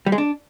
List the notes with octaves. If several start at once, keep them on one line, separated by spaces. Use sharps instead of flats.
G3
G#3
D4